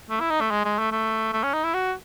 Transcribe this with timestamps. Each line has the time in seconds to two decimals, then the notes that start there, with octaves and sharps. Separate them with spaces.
0.10 A3
0.20 E4
0.30 D#4
0.41 A3
0.51 G#3
0.65 G#3
0.79 A3
0.92 A3
1.33 A3
1.43 C#4
1.54 D#4
1.64 E4
1.74 F#4